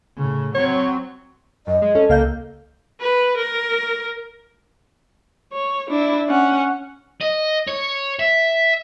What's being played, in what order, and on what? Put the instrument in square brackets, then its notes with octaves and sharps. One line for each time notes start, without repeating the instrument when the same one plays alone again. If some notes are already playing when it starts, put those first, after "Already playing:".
[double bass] A2 C#3
[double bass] F#3 C4 [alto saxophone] C#5
[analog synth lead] F#2 [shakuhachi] D#5
[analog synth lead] G#3
[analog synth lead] C#4 [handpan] A4
[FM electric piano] C#2 F5 G6 [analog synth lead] A#3
[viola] B4
A#4
C#5
D4 E4
C#4 F#5
[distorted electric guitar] D#5
C#5
E5